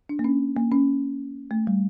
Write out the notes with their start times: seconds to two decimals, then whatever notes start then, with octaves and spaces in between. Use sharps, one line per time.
0.09 D4
0.19 A#3
0.24 C#4
0.57 A#3
0.72 C#4
1.51 A3
1.67 G3